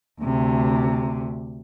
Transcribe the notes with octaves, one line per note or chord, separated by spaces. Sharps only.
D2 C3